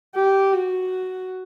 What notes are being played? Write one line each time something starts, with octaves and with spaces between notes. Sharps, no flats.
G4
F#4